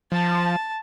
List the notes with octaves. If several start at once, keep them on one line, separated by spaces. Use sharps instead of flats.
F3 A5